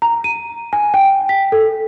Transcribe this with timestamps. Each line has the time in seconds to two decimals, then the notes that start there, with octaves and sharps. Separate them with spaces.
0.02 A#5
0.24 D#7
0.73 G#5
0.94 G5
1.29 B6
1.52 A4